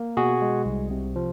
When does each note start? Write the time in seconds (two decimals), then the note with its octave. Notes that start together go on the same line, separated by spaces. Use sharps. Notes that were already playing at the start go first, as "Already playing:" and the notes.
Already playing: A#3
0.17 B2 F#4 G#4
0.42 G#3
0.66 C2
0.91 C3
1.16 F3